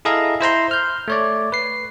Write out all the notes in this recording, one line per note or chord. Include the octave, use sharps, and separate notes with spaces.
E4 G#4 A4 D#5 F5 A#5
E4 C5 A#5 C6
F6 G6
A3 C#5 D5
B4 C7